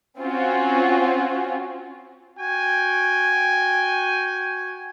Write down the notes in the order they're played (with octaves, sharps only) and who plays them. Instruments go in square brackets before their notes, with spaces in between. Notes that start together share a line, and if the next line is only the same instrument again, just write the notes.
[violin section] C4 C#4 F4 F#4
[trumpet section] F#4 G5 G#5